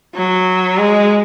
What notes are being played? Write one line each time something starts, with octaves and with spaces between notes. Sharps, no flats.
F#3
G#3